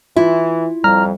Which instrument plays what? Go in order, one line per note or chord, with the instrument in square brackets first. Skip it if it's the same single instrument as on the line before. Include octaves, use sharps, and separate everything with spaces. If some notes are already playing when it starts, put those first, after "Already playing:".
[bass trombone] E3 [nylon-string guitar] E4 [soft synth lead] F4
[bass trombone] F2 [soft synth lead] G3 [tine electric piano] A#5 F6